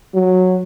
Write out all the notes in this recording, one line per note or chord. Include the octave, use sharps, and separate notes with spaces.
F#3